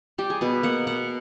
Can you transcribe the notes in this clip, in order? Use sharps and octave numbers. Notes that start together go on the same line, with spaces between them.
G3 G4
G#4
B2 B4
A#3 F#5
B2 F#5